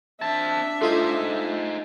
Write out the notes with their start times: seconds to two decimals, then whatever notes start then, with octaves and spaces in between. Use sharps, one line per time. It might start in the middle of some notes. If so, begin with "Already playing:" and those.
0.22 C4 D4 E5 A5
0.81 A3 D#4 F4 C5 D#5